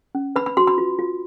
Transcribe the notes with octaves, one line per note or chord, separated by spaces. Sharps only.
C#4
B4 B5
B5
F#4 C6
B5
F4
F4